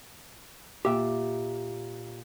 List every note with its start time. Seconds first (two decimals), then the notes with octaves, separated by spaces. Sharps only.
0.85 A#2 G4 E5